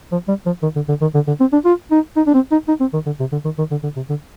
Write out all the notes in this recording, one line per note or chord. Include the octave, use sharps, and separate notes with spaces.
F3
G3
F3
D#3
D3
D3
D#3
D3
D3
C4
D4
F4
D#4
D#4
D4
C4
D#4
D#4
C4
D#3
D3
C3
D3
D#3
D#3
D3
D3
C3
D3